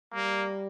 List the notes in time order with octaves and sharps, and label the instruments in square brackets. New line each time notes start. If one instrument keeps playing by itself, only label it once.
[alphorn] G3 [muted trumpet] A#3